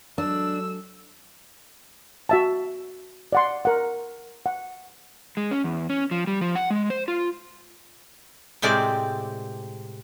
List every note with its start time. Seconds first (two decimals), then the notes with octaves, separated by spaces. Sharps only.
0.18 F#3 G#3 D4 A4 E6
2.29 F#4 E5 A5
3.33 D5 F#5 C6
3.65 A#4 F#5
4.46 F#5
5.37 G#3
5.51 C#4
5.64 E2
5.90 C#4
6.11 F3
6.27 G3
6.41 F3
6.55 F#5
6.70 G#3
6.90 C5
7.08 F4
8.62 A2 C3 G#3 C4 D5